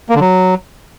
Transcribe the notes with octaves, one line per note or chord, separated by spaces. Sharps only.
A#3
D3
F#3